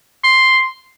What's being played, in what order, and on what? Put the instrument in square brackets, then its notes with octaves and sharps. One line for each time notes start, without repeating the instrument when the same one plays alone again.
[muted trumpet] C6